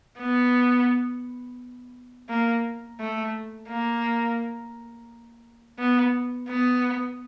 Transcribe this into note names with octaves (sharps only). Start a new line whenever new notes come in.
B3
A#3
A3
A#3
B3
B3